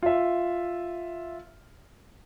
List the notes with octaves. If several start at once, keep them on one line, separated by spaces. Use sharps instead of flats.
F4 E5